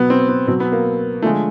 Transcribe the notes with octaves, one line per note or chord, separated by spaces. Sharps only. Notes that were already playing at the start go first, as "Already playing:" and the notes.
Already playing: B2 F#3 B3
C4
B3
B2 F#3 C4
B3
A#3
D3 F3 G#3 A3